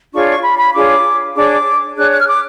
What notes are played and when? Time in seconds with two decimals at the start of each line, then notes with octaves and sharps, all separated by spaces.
0.13 D4 F4 G#4 C#5 C#6
0.29 C#6
0.44 B5
0.59 B5
0.74 D4 F4 G#4 C#5 D6
1.35 D4 G#4 C#5 D6
1.96 D4 G#4 C#5 F#6
2.11 F#6
2.20 F6
2.27 D6